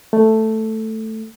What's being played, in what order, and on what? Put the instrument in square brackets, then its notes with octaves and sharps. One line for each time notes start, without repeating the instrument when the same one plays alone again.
[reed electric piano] A3